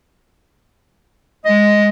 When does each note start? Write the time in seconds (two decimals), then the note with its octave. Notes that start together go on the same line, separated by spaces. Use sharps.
1.45 G#3 D#5